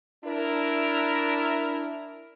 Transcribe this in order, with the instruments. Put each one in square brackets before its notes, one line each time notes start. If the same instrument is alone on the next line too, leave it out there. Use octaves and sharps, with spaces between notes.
[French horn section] D4 E4 A#4